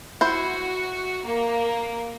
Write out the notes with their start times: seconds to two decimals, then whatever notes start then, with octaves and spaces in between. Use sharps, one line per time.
0.21 E4 F#4 C5
1.25 A#3